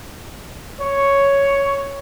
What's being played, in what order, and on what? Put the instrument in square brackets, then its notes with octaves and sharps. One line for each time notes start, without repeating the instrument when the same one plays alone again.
[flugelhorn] C#5